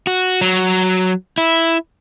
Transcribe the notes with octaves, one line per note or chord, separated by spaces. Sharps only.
F#4
F#3
E4